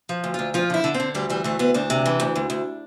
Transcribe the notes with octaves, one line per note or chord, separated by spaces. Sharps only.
F3
D2
D2 F4
F3 F4
D3 E4
D3
C4
D3
D2 G3
E3 G3
D2 A3
D2 B3
D2 D4
C3
E3
D2
D2
D2